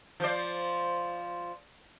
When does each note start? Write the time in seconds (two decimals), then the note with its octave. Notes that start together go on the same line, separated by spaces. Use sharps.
0.20 F3 C5 D5